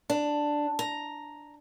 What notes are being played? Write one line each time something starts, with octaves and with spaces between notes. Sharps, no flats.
D4
A#5